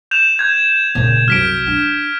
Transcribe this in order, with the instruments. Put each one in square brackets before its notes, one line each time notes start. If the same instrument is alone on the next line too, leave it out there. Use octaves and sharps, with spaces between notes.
[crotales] G6 E7 F7
G6 G#6
[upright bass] A#2 C#3
[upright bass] C2 F#2 [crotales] F6 B6 D7
[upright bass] D4